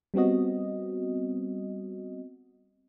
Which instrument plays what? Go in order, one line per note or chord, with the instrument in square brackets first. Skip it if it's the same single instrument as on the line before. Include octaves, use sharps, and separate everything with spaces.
[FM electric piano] G3 B3 C4 F#4 D#5